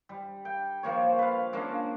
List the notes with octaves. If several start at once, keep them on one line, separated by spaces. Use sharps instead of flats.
G3
G5
F3 A#3 C#5
B4 F5
G#3 A#3 C#4 D4